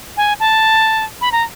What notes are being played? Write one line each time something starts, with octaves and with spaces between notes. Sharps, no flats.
G#5
A5
B5
A#5